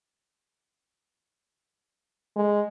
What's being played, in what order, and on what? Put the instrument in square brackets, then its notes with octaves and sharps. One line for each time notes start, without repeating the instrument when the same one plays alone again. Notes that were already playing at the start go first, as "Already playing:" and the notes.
[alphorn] G#3